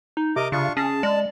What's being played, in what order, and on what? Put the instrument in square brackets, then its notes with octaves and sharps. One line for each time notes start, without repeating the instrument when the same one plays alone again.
[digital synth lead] D#4
[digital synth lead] C3 [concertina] A#4 D#5 D6
[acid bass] C#3 [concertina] D4 F4 C#6
[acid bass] C#4 [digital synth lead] G#4 [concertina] A5
[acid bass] G#3 [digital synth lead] D5